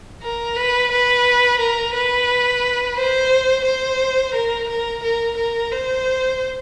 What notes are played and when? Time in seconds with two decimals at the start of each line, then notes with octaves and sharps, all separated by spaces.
0.23 A#4
0.57 B4
0.92 B4
1.59 A#4
1.94 B4
2.97 C5
3.65 C5
4.35 A#4
4.69 A#4
5.04 A#4
5.37 A#4
5.72 C5